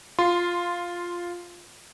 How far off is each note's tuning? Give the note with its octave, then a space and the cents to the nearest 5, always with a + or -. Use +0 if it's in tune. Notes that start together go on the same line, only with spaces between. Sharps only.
F4 +0 C6 -10